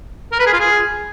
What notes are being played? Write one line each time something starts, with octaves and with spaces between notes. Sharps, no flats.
A#4
B4
G#4
F4
G#4